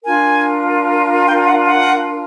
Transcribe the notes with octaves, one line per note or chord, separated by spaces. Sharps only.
D4 F4 A#4 G#5
G5
F#5
F#5